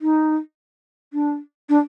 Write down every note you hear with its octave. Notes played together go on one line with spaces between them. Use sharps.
D#4
D4
D4